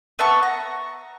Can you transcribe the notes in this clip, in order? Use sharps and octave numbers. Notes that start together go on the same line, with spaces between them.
B3 E5 A5 C#6
A#5